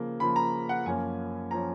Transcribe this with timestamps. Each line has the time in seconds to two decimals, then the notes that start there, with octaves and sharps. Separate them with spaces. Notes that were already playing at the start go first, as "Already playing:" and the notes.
Already playing: C#3 F3 A#3
0.20 C#3 F3 A#3 B5
0.36 A#5
0.69 F#5
0.86 F#2 F3 A#3 C#4 G#5
1.51 F3 A#3 C#4 A#5